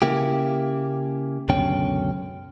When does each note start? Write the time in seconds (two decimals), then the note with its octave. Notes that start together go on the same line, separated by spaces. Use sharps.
0.02 C#3 A#3 E4 G4
1.49 C#2 F#2 B2 D3 C#4 G5